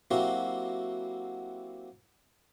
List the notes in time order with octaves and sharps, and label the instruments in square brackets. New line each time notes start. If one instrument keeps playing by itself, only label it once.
[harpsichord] F#3 A#3 C4 E4 F#4 G4